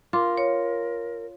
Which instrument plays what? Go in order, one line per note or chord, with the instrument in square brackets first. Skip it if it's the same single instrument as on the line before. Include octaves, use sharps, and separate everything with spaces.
[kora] F4 [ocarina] A#4 [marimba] D6
[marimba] C#5